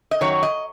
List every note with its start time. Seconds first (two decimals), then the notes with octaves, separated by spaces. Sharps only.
0.11 D#5
0.21 F#2 D#3 F#3 C#5
0.43 D#5